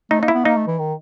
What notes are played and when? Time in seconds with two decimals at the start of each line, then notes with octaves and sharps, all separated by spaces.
0.11 A3 D#4
0.23 A#3 D#4
0.28 E4
0.34 B3
0.44 A#3 D#4
0.57 A3
0.67 E3
0.79 D#3